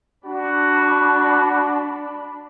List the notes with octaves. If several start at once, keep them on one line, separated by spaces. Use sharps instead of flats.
D4 F#4 B5